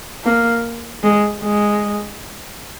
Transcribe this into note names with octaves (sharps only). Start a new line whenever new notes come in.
A#3
G#3
G#3